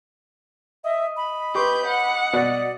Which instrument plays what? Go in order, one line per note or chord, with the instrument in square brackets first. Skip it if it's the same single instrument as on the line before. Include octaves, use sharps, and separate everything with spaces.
[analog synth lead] D#5 [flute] E5
[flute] B5
[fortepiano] G4 C6 C#6 [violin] B4 G6
[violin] F#5
[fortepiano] B2 F#4 [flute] D5